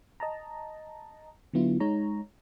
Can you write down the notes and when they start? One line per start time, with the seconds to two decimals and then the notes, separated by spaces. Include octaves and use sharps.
0.20 D#5 A5 A#5
1.54 D3 F#3 B3 E4 F4
1.80 G#3 D#4 C#5 A#5